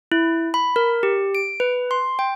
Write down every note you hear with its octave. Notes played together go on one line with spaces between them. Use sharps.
E4
B5
A#4
G4
D7
B4
C6
G5